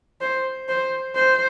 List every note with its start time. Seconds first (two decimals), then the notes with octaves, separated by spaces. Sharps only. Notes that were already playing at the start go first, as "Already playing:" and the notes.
0.21 C5
0.69 C5
1.15 C5